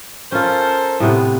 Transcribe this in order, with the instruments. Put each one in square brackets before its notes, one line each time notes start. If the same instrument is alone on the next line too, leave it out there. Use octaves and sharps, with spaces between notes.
[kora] C#4 F4 [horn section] A4 A#4 C5
[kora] A2 C3 B3